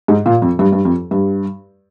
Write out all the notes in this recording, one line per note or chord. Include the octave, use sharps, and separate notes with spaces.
G#2
A#2
F2
G2
G2
F2
G2